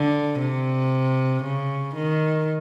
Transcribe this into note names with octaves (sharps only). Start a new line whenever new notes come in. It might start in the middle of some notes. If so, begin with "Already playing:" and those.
Already playing: D3
C3
C#3
D#3